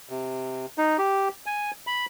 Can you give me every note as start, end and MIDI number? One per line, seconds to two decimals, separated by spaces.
0.09 0.66 48
0.78 0.97 63
0.98 1.29 67
1.46 1.71 80
1.87 2.06 83